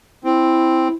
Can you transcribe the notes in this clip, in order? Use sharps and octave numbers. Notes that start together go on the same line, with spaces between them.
C4 E4